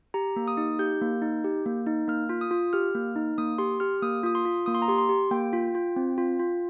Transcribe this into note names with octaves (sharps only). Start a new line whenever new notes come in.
G4 A#5
A#3
D#6
D#4
G4 G6
A#3
D#4
G4
A#3
D#4
A#3 F6
F4
D#6
F4
G4 F6
A#3
D#4
A#3 D#6
G4 C6
G4 F6
A#3 D#6
F4 D#6
C6
F4
A#3 D#6
C6
A#5
G4 C6
C6
G4
A#3 G5
F4
F4
C4
F4
F4